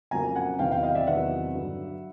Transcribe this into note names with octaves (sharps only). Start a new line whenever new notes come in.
F2 C#3 F#3 A#3 G#5 A#5
F#5 G#5
E2 C3 D#3 F#3 F5 G5
F5 G5
D#5 F5
D5 E5
E2 C3 D#3 F#3 E5 F#5
G2 D3 F#3